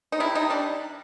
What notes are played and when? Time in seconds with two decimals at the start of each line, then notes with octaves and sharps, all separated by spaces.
0.12 D#4
0.20 C3 E4
0.35 C3 D#4
0.50 G3 D4